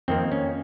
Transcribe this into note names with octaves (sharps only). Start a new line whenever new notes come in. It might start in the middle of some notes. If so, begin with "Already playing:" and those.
F2 D#3 A#3 C4
C#4